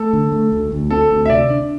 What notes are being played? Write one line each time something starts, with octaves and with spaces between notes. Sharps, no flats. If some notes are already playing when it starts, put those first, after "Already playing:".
Already playing: A3 A4
D3
A3
D2
D2
C4 A4
D2
E5
C3 D5
D4